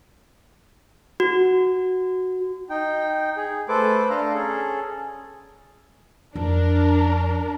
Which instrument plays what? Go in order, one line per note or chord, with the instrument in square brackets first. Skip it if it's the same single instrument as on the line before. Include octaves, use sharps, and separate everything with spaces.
[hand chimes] F#4
[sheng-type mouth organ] D#4 G5
G#4
A3 A4 B4 C5 D6
D4 A4 F5 A#5
C#4 G#4 A4
[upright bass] F2 [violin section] D4 A#4